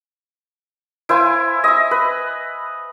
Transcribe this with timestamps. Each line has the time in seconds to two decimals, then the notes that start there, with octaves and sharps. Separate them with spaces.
1.09 E4 C5 F5 G#5
1.64 D#5 E5
1.91 B4